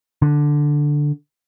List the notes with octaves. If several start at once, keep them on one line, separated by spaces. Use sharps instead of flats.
D3